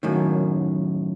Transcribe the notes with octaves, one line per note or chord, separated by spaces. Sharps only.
F#2 A2 D#3